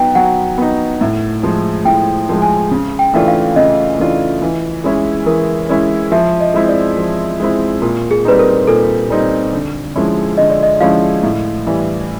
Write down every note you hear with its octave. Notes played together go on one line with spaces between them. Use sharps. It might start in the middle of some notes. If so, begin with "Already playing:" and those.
Already playing: F#3 B3 D#4 G5
F#3 F#5
B3 D#4
A2
F3 G#3
A2 G5
F3 G#3
G#5
C#3
G5
E3 A3 D4 F4
F5
C#3 D#5
E3 A3 D4 F4
E3
G#3 C#4 E4
E3 A#4
G#3 C#4 E4
F3 E5
D#5
G#3 C4 E4
D5
F3
G#3 C4 E4
A#2 A#4
G#4
G3 C4 D#4 B4
A#4
A#2 A4
G3 C4 D#4
D3
F3 G#3 C#4 E4
D3 D#5
D5
D#5
F3 G#3 C#4 E4 F5
A2
E3 G3